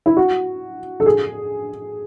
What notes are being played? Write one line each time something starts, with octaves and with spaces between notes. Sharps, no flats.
E4
F#4
A4
G#4